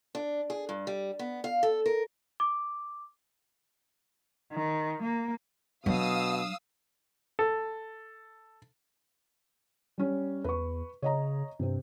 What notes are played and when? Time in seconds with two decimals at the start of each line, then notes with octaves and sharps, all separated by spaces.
0.15 D4
0.50 G#4
0.69 G2
0.87 G3
1.19 B3
1.44 F5
1.63 A4
1.86 A#4
2.40 D6
4.52 D#3
5.02 A#3
5.86 B2 F#3 D4 F5 D#6 E6
7.39 A4
9.98 G3 C#4
10.44 E2 B4 C#6
11.02 C#3 C#5 D#5 A#5
11.59 G2 C3 C4